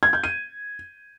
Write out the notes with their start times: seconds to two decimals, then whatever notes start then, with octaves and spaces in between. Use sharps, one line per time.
0.03 G#6
0.13 G6
0.23 D#7